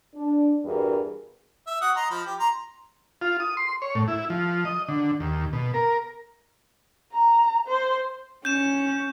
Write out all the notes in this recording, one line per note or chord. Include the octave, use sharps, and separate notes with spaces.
D4
E2 G2 F#4 G#4 A#4 B4
E5
F#4 F#5 D#6
D#5 A#5 C6
F3 B5
G4
A#5 C6
F4
D#6
C6
C#5
A2
E4
F3
D#5
D3
D#2
B2
A#4
A#5
C5
C#4 G6 E7